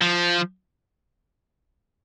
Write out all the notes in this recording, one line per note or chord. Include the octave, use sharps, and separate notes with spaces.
F3